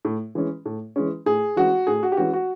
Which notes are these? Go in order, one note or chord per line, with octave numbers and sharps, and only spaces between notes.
A2
E3 G#3 C#4
A2
E3 G#3 C#4
A2 G#4
E3 G#3 C#4 F#4
A2 G#4
F#4
G4
E3 G#3 C#4 F#4
F#4